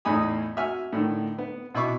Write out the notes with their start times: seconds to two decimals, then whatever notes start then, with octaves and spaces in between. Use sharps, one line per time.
0.05 E2 A2 D#4 G#5 B5 D#6
0.57 F#4 E5 G#5 F6
0.93 A2 D3 D#3
1.38 B3
1.75 B2 E4 B5 C#6 D6